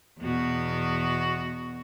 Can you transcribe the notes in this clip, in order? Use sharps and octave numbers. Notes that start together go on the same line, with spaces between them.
E2 B2 F#4